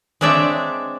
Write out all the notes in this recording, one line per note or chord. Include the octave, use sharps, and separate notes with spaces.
G#3 C4 D4 C#5 E5